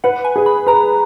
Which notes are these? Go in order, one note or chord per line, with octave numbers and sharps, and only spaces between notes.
B4 F#5
G#5
G#4
B5
B4 A#5